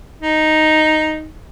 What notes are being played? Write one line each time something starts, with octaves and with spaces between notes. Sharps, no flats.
D#4